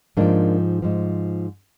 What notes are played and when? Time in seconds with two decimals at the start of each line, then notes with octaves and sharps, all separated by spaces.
0.17 G#2 F3 A#3 D4
0.82 G#2 F3